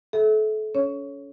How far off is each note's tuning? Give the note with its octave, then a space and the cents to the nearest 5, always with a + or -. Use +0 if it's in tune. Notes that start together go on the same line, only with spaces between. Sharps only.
A4 -35 E5 -20
C#4 +25 C#5 +0